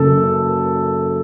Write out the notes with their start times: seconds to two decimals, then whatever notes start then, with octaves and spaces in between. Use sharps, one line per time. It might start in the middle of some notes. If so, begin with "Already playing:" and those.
Already playing: F#1 F#2 C#3 A4